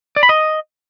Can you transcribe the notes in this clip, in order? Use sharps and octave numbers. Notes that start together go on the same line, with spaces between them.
D5
B5
D#5